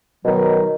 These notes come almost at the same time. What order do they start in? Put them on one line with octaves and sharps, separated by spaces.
B2 F#3 D#3